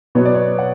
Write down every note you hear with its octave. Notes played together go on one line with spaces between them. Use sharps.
B2 F#3 B3 C#5
D5
C#5
F#5